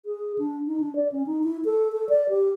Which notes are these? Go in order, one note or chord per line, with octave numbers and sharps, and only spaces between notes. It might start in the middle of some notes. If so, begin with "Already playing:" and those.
G#4
D4
D#4
D4
D5
C#4
D#4
E4
A4
A4
D5
G4